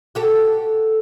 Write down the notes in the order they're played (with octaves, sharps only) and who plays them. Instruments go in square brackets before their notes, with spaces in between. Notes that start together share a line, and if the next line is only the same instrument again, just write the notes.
[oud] F#4 G4 A4